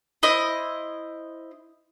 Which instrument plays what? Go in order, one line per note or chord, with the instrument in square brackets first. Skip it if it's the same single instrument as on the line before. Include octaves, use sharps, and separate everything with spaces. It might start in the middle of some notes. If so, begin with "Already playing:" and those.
[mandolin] E4 C5 D#5